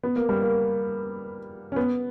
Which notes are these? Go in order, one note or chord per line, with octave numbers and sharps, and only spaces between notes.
B3
A#3
G3
A#3
C#4
B3